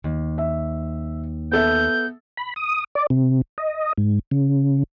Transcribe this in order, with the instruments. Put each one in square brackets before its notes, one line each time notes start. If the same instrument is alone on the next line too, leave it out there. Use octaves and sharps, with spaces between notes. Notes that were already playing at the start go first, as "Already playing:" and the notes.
[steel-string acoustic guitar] D#2
[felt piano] E5
[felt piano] B3 A4 E5 [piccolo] G6
[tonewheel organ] B5
D#6
D5
C3
D#5
G#2
C#3